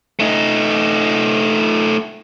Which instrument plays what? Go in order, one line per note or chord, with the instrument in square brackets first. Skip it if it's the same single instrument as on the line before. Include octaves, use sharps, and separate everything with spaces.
[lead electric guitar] A3 D#4